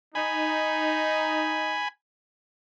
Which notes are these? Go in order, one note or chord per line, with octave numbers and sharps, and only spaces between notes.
D#4 G#5 B5